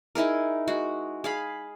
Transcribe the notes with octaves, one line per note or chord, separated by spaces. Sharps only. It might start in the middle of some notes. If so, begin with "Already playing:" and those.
D#4 E4 G#4 A#4
G#3 F#4
G#4 F5 B5